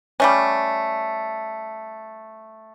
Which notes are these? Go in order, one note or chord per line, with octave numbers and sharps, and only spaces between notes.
G3 A3 C#4